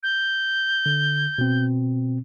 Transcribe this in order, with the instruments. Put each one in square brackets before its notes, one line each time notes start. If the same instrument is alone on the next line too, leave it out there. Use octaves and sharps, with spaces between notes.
[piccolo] G6
[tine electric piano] D3
B2 C4